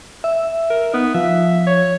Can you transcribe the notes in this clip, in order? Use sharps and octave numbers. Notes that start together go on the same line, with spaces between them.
E5
A#4
B3 D#4
F3 E5
C#5